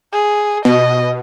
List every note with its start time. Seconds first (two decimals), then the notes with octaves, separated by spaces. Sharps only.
0.13 G#4
0.65 B2 D#5